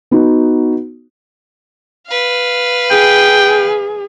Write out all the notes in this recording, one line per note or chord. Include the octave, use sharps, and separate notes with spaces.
B3 D#4 F#4
B4 F5
G#4 G5